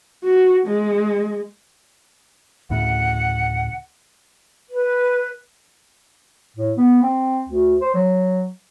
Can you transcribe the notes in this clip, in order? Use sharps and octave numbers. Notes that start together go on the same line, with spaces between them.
F#4
G#3
D2 A2 C#3 F#5
B4
A2
B3
C4
D2
C5
F#3